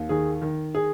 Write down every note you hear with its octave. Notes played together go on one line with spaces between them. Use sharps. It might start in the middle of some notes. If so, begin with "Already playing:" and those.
Already playing: D#2
D#3 G#4
D#3
G#4